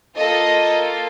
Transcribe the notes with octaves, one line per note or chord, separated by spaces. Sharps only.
A#3 F4 A4 D#5